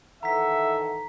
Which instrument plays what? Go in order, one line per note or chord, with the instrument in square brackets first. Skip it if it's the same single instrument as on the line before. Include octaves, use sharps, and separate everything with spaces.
[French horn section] D#3 E3 A4 [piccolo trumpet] E5 [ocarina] F#5 [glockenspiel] A#5 B6